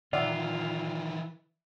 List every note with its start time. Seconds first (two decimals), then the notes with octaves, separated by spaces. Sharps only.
0.13 A#2 D#3 E3 F4 D5 E5 F#5